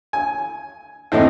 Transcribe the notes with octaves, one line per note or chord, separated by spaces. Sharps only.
G#5
D#2 A2 E3 C4 D#4